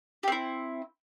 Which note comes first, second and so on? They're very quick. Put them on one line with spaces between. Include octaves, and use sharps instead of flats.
G4 C4 E4